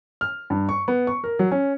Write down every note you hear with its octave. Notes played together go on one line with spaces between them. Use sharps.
F6
G2
C#6
B3
C#6
A#4
F#3
C#4